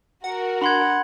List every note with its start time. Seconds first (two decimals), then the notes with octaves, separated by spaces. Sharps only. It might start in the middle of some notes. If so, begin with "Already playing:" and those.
0.24 F#4 A#4 F#5
0.61 D4 F#5 B5 C6 G#6